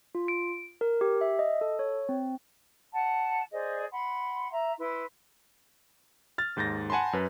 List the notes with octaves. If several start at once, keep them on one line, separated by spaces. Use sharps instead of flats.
F4
D7
A#4
G4
E5
D#5
A4
C#5
C4
F#5 A5
G#4 C5 D5 D#5
F#5 B5 C6
E5 A#5
E4 B4 C6
F6 A6
D#2 G#2 G6 A6 A#6
F#5 G#5 A5 B5 C6
F#2 B4